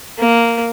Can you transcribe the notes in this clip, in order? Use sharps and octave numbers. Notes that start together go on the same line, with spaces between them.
A#3